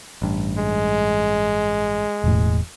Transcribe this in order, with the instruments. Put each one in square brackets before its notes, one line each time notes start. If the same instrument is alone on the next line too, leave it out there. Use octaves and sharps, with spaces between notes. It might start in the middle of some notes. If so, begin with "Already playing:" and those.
[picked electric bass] A1 G2
[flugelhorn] G#3
[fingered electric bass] E1 E2 A2